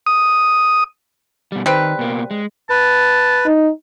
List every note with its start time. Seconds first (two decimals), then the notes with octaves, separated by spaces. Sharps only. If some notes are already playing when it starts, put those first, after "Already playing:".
0.07 D#6
1.52 B2 G3
1.66 D#3 G3 C4 B4
1.99 B2 A#3
2.31 G#3
2.70 B4 A5
3.46 D#4